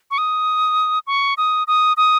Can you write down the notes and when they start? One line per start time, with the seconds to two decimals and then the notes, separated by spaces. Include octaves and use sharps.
0.11 C#6
0.18 D#6
1.07 C#6
1.37 D#6
1.67 D#6
1.97 D#6